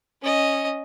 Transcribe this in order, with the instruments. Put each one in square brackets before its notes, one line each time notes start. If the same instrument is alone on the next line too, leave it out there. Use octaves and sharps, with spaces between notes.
[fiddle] C#4 D#5